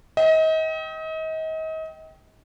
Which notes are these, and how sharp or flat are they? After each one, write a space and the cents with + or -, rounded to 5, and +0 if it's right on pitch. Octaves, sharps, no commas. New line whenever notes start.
D#5 +35 G5 -10